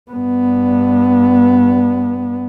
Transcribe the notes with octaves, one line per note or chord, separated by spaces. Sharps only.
G2 B3